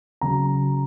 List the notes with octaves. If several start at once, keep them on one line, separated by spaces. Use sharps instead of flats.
C#3 F#3 A#5